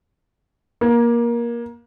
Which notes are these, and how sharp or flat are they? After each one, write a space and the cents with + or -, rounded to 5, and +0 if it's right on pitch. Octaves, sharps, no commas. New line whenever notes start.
A#3 +20